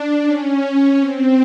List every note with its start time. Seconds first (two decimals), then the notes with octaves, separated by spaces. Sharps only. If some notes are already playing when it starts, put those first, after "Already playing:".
Already playing: D4
0.25 C#4
0.99 C4